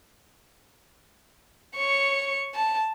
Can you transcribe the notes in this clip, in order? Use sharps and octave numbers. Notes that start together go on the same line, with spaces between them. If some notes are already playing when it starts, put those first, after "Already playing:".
C#5 C#6
A5